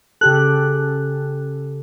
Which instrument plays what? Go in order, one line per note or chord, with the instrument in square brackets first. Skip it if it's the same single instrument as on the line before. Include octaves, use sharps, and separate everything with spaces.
[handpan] C#3 G4 A4 [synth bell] F#6